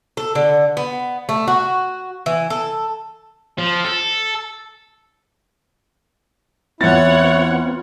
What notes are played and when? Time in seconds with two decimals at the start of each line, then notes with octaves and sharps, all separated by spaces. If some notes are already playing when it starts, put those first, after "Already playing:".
0.17 A4
0.35 D3
0.77 B3
1.29 A3
1.48 F#4
2.26 E3
2.50 A4
3.58 F3
3.85 A4
6.81 E2 B3 C4 E4 F4 C#5 F#5 A6